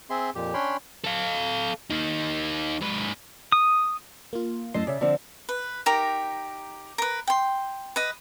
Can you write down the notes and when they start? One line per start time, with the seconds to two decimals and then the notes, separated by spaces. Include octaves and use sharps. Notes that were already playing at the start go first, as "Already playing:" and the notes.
0.10 C4 G#4 E5 C6
0.35 F2 A#2 G4
0.54 C#4 D4 C#5 G5 B5 C6
1.05 A4 F5
1.90 A#3 D#4
2.81 G#2 B4
3.52 D#6
4.33 A#3 F4
4.74 F#2 A2 A4 D#5 C6
4.87 C#3 D5 E5
5.01 D3 F3 C4
5.49 B4
5.86 D#4 G4 A#4 A#5
6.98 A#4 B4
7.27 G5 C6
7.96 B4 D#5